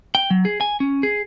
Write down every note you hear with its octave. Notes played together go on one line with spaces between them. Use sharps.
G5
F#3
G#4
G#5
C#4
G#4